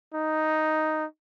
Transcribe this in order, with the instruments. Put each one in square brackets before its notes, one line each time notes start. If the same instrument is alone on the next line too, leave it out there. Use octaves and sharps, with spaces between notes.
[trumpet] D#4